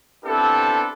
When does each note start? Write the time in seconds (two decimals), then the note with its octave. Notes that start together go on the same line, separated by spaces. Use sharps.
0.25 B3 C4 D4 E4 G4 A4